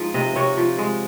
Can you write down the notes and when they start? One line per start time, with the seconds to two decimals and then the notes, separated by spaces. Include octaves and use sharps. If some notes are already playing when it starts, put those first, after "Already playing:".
Already playing: F3 G#3 D#4
0.14 C3 D#5
0.36 C3 C#5
0.57 F3
0.78 G#3